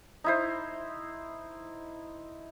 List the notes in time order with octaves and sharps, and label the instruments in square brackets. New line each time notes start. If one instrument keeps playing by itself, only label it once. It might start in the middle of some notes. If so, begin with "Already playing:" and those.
[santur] D#4 E4 C5